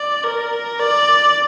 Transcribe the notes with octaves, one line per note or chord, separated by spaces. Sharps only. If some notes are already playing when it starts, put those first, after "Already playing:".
Already playing: D5
A#4
D5